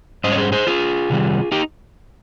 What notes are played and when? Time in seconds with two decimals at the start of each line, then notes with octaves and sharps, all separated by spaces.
0.24 G#2 G3 C#4 C5 D#5
0.32 C#5
0.38 G#4 C5
0.52 G#4 C5
0.67 F4 G#4
1.10 C3 D#3 G3
1.52 D#4 G4